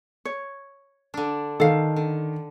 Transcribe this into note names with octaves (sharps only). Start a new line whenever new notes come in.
C#5
D3 D4
D#3 A4 F5
D3